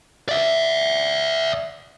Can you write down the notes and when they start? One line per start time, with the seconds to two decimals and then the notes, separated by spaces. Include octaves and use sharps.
0.29 D5 E5